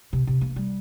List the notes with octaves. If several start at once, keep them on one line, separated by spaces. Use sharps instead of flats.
C3
C3
A#3
G3